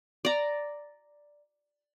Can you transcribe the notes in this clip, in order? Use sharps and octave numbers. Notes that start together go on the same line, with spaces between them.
D5 A#5